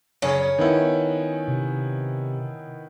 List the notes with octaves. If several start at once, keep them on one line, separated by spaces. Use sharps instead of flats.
F#2 C#3 C#4
D#3 B3 E4
C3